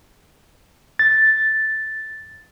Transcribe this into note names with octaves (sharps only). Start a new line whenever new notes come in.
A6